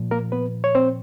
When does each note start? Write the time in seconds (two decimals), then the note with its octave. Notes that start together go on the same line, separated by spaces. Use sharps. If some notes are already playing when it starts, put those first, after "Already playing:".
Already playing: A#2 F3
0.11 A#3 A#4
0.32 B3 B4
0.64 C#5
0.75 C4 C5